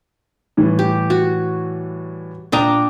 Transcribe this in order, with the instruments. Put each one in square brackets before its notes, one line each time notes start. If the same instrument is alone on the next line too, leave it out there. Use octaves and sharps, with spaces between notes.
[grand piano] A2 E3 G3
[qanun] G4
F#4
[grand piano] A#2 D#6 D#7 [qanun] D4 G5 A#5